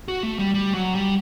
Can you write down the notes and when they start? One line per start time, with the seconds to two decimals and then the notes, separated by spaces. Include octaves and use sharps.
0.08 F#4
0.23 A3
0.39 G3
0.54 G3
0.74 F#3
0.95 G3